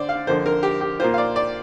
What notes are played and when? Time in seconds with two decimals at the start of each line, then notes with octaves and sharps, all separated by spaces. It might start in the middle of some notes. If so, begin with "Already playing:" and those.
Already playing: D3 C5 D5
0.09 F5
0.27 F2 D3 A#3 C5
0.46 A#4
0.63 G4
0.81 G4
0.99 A#2 A#3 F4 C5
1.14 F5
1.18 D5
1.36 D5